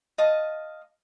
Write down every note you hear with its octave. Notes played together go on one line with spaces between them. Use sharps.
D#5 F5 A5 D#6